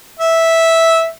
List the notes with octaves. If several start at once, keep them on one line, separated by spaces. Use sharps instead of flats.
E5